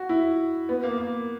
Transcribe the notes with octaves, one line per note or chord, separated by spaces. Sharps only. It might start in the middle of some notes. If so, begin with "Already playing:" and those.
Already playing: F#4
E4
B3
A#3
A#3